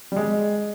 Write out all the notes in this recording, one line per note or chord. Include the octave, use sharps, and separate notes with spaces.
G3
G#3